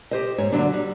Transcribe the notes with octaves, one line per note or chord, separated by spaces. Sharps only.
G4 C5 D#5
G#2 C#5
D3 F#3 D4
G3